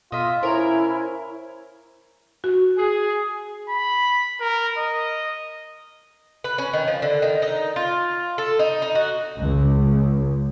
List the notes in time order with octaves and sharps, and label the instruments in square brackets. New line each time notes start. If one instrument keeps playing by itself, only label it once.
[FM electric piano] B2 [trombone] F4 [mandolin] D#5 E5
[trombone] C#4 [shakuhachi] E4 [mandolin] A#4 [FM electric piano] C5
[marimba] F#4
[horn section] G#4
[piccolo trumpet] B5
A#4
D#5
[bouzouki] B4
C#4
D#3
F3
D3
D#3
D#4
F4
A4
D#4
D#4
F#4
[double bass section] C#2